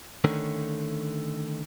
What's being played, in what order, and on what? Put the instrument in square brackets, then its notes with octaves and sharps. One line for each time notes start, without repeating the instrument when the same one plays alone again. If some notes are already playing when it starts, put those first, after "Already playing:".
[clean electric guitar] D3 D#3 A3 C#4